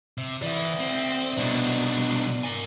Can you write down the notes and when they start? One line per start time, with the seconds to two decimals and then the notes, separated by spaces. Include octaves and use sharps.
0.18 C3
0.42 E3 D5 E5
0.80 C4
1.38 C2 B2 D4 D#4
2.43 A#4 G#5